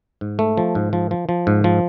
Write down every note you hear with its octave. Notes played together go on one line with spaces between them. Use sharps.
G#2
A3
F3
G#2
F3
F3
F3
G#2
F3